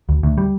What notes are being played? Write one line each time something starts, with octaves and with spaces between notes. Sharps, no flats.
D2
D2
G3